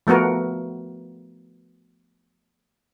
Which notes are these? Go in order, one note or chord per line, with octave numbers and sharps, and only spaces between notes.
F3 A3 B3 F#4 A#4